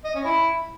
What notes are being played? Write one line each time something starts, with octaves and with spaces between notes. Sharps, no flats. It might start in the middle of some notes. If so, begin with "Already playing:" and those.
D#5
C#4
E4